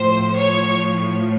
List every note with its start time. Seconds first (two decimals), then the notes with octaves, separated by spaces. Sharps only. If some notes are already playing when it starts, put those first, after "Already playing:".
Already playing: A2 F3 C5
0.36 C#5